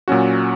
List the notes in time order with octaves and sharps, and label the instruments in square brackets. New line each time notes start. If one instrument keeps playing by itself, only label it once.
[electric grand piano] A#2 F#3 C#4 F#4